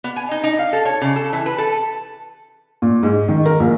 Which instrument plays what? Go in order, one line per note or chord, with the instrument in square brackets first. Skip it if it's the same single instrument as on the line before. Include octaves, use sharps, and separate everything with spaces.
[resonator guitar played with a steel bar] B3
G#5
D#4
D#4
F5
A4
C#5
C#3
A4
E3
B4
A4
[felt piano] A#2
G#2
D#3
A#4
A#1